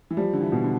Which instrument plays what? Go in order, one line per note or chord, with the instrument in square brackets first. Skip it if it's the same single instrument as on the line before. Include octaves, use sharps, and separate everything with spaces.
[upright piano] E3
[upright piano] F3 [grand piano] G3
[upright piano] D3
E3
[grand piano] B2
[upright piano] D3